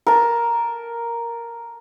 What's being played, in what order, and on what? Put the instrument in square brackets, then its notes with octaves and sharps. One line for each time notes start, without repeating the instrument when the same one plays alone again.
[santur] A#4 A5